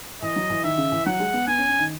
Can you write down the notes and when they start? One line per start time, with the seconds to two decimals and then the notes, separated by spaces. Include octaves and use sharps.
0.22 E3 D#5
0.36 F#3
0.50 E3
0.64 D#3 E5
0.78 C#3
0.92 E3
1.06 F#3 F#5
1.20 G#3
1.34 B3
1.47 B3 G#5
1.58 C#4
1.69 C#4
1.79 D#3